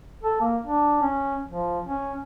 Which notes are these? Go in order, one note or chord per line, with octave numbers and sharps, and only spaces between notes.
A4
A#3
D4
C#4
F3
C#4